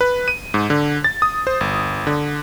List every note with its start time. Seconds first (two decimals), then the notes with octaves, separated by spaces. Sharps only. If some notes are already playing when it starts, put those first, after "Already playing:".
0.01 B4
0.28 D#7
0.54 G#2
0.70 D3
1.04 A6
1.22 D#6
1.47 C5
1.61 G1
2.07 D3